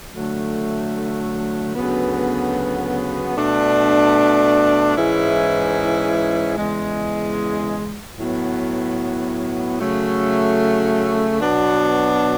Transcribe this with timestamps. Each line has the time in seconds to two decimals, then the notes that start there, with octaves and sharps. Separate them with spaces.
0.14 D3 F#3 A3
1.75 D2 C#3 F#3 B3
3.35 B2 A3 D4
4.96 G#2 E3 G#3 C#4 E4
6.57 E2 C#3 G#3
8.18 A2 F#3 B3
9.79 C#3 F#3 A3
11.40 B2 F#3 B3 D4